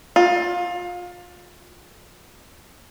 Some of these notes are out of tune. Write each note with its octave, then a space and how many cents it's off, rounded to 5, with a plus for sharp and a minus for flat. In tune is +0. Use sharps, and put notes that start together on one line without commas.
F4 +25